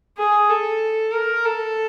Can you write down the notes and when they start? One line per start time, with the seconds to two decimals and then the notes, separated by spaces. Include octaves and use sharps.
0.18 G#4
0.50 A4
1.13 A#4
1.45 A4